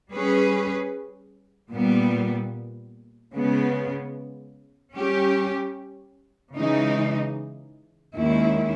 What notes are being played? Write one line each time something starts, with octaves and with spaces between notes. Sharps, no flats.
G3 C#4 G#4 B4
A#2 G3 B3
C#3 G#3 B3
G3 C#4 G4
C#3 E3 G#3 D#4
D#2 D#3 G#3 C#4 E4